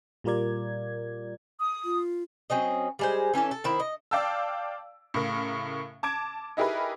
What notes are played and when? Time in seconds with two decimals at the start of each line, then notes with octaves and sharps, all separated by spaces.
0.24 A#2 G3 F4 A#4 D5 G#6
1.59 D#6
1.85 F4
2.50 F#3 C4 C#4 D#5
2.99 G3 G#3 C5
3.33 E3 C#4 D4 A4
3.51 A4
3.64 D#3 C4 E4
3.80 D#5
4.11 D5 F5 G5 A5 E6
5.14 A2 C#3 A#4
6.03 A5 D6 G#6 D7
6.57 D#4 E4 G4 G#4 A#4 B4